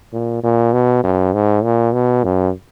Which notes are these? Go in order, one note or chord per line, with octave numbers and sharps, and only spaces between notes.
A#2
A#2
B2
F#2
G#2
A#2
B2
F#2